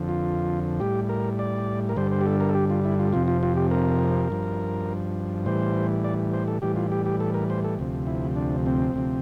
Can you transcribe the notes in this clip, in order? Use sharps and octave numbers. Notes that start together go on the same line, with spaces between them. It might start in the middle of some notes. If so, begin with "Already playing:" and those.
Already playing: F2 D3 F3
F4
A2 G3 G4
A#4
D5
A#4
G2 D3 G3 C5
C5
G4
A4
A#4
A4
G4
F4
E4
F4
F2 C3 F3 F4
F4
F4
G4
A#4
G2 F3
A2 E3 G3 C5
D5
C5
A4
A2 E3 G3 G4
F4
G4
G4
A4
A#4
C5
A4
D2 C3 F3
E4
D4
C4
D2 C3 F3